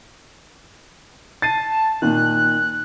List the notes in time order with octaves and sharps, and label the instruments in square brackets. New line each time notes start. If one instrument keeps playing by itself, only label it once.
[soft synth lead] A5 [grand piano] A6 C7 D#7
[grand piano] A#2 D#3 [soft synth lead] F#6